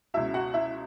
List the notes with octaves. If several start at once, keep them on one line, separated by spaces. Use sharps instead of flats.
C#2 B2 E4 E5
F#4 F#5
E4 E5